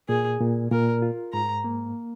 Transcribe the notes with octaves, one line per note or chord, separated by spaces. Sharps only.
A#2 G#4
A#2
A#2 A#4
F4
G#2 A#5
A#3